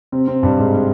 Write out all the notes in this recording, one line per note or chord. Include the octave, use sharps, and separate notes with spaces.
C3 C4
C3 C4
G2 G3
G#2 G#3
G#3